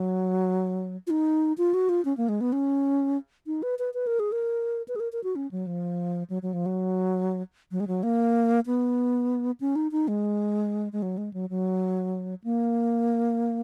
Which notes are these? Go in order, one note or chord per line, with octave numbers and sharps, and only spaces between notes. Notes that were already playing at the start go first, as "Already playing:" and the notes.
Already playing: F#3
F4
D#4
F4
F#4
F4
C#4
A#3
G#3
B3
C#4
D#4
B4
B4
B4
A#4
G#4
A#4
B4
G#4
A#4
A#4
F#4
C#4
F#3
F3
F#3
F#3
F3
F#3
F#3
G#3
F#3
A#3
B3
C#4
D#4
D#4
G#3
G#3
F#3
G#3
F#3
F#3
A#3